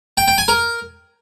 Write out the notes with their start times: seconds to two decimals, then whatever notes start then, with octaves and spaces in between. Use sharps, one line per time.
0.17 G5
0.28 G5
0.38 G#5
0.48 A#4